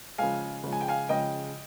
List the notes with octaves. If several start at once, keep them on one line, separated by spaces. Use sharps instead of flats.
C#3 F3 G#3 F5 G#5
C#3 F3 G#3
G#5
G5
F5 G#5
C#3 F3 G#3 D#5 G5